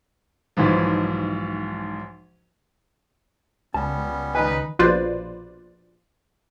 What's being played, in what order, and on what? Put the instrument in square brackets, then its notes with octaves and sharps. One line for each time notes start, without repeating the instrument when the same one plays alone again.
[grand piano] B1 G#2 E3 F3
[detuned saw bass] C#2 [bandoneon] G3 B3 C#4 [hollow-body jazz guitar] A5
[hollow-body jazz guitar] D#3 D#5 G#5 [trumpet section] D#4 B4
[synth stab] A#1 B2 F4 B4 C5 D5